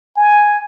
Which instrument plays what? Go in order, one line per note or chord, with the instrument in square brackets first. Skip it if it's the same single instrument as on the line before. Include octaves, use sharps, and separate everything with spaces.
[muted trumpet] G#5